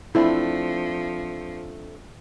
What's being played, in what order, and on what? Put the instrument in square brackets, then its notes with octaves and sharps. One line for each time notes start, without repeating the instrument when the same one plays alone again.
[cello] F3 [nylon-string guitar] A3 C4 D4 [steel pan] E4